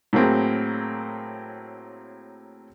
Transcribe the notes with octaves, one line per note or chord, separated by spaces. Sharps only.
A2 F#3 A#3 C4 G#4